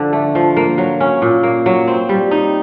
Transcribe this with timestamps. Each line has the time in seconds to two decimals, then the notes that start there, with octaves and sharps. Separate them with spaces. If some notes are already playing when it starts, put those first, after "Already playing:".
Already playing: D3 F3 D4
0.13 A3
0.35 F3
0.57 A#3
0.78 F#3
1.00 C#4
1.22 A#2
1.43 A#3
1.66 F#3
1.88 C4
2.09 G3
2.31 D#4